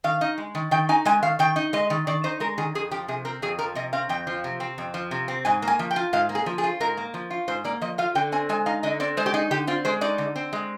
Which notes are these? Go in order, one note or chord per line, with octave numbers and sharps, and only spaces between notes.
D#3 F5
D#4
G#3
D#3
D#3 G5
D#4 G#5
G#3 G#5
D#3 F5
D#3 G5
D#4
G#3 D#5
D#3
D#3 D5
D#4 C5
G#3 A#4
D#3 G#4
F2 G#4
F3 G4
C3 G#4
C4 A#4
F2 G#4
F3 A#4
C3 D#5
C4 F5
F2 G5
F3
C3
C4
F2
F3
C3
C4
G#2 G#5
A#3
G#5
F3
G5
F4
G#2 F5
A#3
G#4
F3
G#4
F4
G#2 A#4
A#3
F3
F4
G#2 C5
A#3 D5
F3 D#5
F4 F5
D3 G5
C4 G#5
G#3 G#5
D#4 F5
D3 D#5
C4 D5
G#3 C5
G4
D#4 G#4
D3 G4
C4 F4
G#3 C5
D#4 D5
D3
C4
G#3